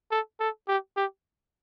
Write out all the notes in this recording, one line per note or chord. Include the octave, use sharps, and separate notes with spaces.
A4
A4
G4
G4